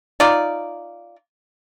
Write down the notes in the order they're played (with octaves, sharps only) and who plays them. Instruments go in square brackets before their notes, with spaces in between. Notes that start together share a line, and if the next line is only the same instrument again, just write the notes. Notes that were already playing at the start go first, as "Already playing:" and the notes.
[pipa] D#4 F4 D5